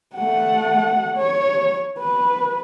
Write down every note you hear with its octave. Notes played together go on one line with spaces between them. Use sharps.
A3 F#5
C#5
B4